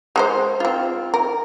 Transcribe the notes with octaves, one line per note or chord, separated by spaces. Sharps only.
G#3 A4 C5
C4 F4
A#4